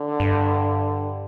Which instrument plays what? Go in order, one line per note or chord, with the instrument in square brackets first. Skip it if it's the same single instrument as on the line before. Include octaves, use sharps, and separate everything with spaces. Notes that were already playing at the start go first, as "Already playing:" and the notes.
Already playing: [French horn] D3
[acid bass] G2